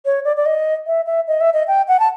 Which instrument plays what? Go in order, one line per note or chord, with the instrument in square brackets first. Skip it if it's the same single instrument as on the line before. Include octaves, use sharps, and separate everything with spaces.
[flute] C#5
D5
D5
D#5
E5
E5
D#5
E5
D#5
G5
F#5
A5